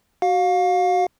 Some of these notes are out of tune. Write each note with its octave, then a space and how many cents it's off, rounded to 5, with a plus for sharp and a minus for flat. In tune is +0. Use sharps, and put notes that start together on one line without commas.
F#4 +15 F5 +30